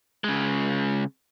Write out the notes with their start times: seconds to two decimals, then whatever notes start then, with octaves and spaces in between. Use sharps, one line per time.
0.24 C#3 G#3